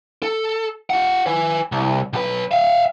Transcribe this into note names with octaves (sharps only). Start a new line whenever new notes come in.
A4
F4 F#5
B4 G#5
C2
B1 B4
E5 F5